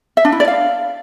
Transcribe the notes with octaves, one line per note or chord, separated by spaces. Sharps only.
E5
D4
E4
D5
F5